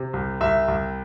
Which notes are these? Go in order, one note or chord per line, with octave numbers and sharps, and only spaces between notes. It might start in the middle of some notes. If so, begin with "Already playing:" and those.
Already playing: C3
C2
C2 E5
C2